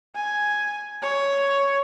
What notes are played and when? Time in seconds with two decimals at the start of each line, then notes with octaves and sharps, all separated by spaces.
0.16 G#5
1.02 C#5